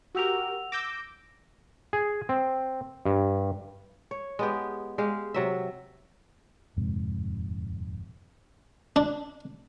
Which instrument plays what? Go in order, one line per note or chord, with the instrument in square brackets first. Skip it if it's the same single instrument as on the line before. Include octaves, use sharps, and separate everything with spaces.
[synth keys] F#4 G4 A#4 [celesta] F#5 E6 F7
[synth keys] D6 E6 G6 [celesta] A#6
[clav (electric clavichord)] G#4
C4
G2
[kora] C#5
G#3 B3 G4
G#3 G4 F5
C3 F#3 E5
[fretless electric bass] D#1 F2 G#2 C3
[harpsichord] D4